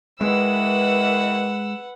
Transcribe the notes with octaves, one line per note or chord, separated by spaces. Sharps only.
D#3 E3 G#3 B4 F#5 E6